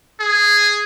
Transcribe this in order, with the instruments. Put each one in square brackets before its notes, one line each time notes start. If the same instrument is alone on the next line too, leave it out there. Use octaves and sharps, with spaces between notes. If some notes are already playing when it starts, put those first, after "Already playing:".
[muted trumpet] G#4